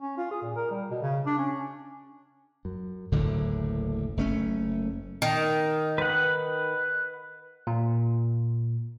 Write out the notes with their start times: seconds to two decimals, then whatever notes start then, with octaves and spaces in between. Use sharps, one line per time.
0.01 C#4
0.17 F4
0.31 G#4
0.42 A#2
0.56 A#4
0.71 G3
0.90 B2
1.02 C#3
1.26 D4
1.38 C#4
2.65 F#2
3.12 F#1 D2 A2 D3
4.17 F#1 A3 C#4
5.22 D#3
5.98 B4 F#5
7.67 A#2